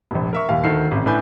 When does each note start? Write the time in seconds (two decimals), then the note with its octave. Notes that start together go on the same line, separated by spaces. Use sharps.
0.11 F1 A#1
0.33 A#4 E5 C#6
0.49 D#1 D#2 F5
0.64 D2 D#3 A4 C7
0.91 A1 C3
1.06 A2 D4 B4 G#5 G6